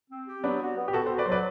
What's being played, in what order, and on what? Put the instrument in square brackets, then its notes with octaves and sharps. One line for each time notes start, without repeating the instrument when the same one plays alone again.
[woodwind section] C4
G4
[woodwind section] F#3 [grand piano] B3 D4
[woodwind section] F#4
B3
[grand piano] G4
[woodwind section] B3 [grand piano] F#4 A4
[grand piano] A4 C5
[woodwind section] F#4
[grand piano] B4 D5
[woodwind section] F#3 [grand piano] C5
[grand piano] B4 D5